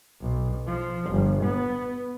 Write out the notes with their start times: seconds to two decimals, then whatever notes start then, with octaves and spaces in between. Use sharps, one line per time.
0.21 B1
0.67 F3
1.11 G1
1.44 B3